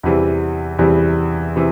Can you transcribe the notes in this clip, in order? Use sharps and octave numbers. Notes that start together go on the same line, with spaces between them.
E2 C3 E3 G3
E2 C3 E3 G3
C3 E3